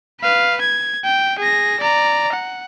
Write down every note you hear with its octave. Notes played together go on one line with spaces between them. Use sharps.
B4 F5
G#6
G5
G#4 A#6
D5 A#5
F#5